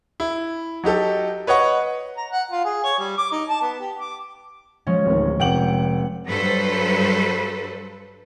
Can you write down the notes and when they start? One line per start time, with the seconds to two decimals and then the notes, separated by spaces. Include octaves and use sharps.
0.20 E4
0.84 F#3 D#4 G4 A4
1.47 B4 C#5 D#5 F#5 C#6
2.17 A#5
2.32 F#5
2.51 F4
2.65 G#4
2.84 C#5
2.99 G3
3.17 D6
3.32 D#4
3.49 A5
3.61 B3
3.80 G4
3.98 D6
4.87 F3 G#3 C#4
5.06 D1 D#3
5.40 F1 F#5 G5 D6 F#7
6.27 G2 F#3 A4 B4 C5